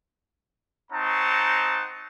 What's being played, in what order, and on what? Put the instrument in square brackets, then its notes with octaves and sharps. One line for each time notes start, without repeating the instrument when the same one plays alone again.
[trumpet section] C4 D#4 C#5 F#5 A5 A#5